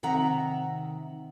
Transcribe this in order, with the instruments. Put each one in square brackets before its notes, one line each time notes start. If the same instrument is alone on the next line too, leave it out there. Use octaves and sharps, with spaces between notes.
[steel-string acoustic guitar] C3 D#3 E5 F#5 A#5